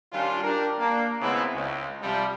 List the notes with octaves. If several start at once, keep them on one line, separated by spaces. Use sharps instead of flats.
D#3 G3 C#4 D4 F4
D4 G4 A#4
A#3 D4
G#1 C#3 G#3 B3 C4 E4
C#2
C3 F3 G3